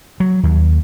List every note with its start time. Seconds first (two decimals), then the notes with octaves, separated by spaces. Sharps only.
0.20 F#3
0.43 D#2